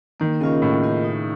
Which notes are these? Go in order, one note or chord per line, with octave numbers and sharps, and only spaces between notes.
D#3 A#3
C#3 C#4 F4 A#4 D#5
A2 A#3
C#4 F4 A#4 D#5
D#4